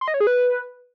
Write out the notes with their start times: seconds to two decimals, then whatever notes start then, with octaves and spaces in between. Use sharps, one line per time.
0.01 C6
0.08 D#5
0.14 C#5
0.20 G#4
0.27 B4